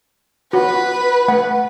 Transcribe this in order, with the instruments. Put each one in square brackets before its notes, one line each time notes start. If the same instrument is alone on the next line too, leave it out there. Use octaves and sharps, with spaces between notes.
[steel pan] F4 F#4 [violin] B4
[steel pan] A3 F#5